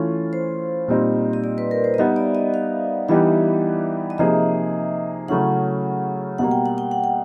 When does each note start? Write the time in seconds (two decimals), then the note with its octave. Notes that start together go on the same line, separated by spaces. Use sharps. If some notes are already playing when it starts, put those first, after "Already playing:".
Already playing: E3 A3 C#4 F4
0.33 C5
0.88 A#2 G3 C4 D#4
1.33 D#5
1.44 D5
1.58 B4
1.71 A#4
1.84 C5
1.94 D#5
1.98 G3 B3 D#4 E5
2.16 D5
2.35 D#5
2.54 F5
3.09 E3 G3 B3 D#4 G4 E5
4.10 D#5
4.18 C3 F3 A#3 D#4 G#4 E5
5.28 C#3 F#3 A3 C#4 E4 F#5
6.38 B2 G3 A#3 F#5
6.51 G5
6.66 F#5
6.78 G5
6.91 F#5
7.04 G5